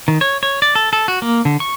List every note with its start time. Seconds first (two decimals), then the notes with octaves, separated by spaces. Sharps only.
0.08 D#3
0.21 C#5
0.43 C#5
0.62 D5
0.75 A4
0.93 A4
1.08 F#4
1.22 A#3
1.45 D3
1.60 C#6